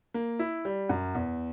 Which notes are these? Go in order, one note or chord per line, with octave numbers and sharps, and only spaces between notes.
A#3
E4
G3
F#2
E2